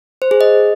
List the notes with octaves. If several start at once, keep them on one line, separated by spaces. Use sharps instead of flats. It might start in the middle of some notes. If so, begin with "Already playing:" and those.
C5
G#4
D#5